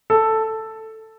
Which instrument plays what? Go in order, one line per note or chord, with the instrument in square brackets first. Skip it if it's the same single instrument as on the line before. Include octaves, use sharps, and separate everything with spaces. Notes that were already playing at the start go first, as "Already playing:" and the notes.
[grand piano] A4